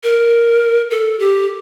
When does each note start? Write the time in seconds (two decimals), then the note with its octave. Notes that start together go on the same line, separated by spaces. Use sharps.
0.03 A#4
0.91 A4
1.19 G4